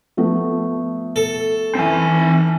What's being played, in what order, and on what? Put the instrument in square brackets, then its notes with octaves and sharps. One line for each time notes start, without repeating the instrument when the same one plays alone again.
[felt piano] F3 A3 B3
[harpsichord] A4
[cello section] E3 [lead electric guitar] C4 G#5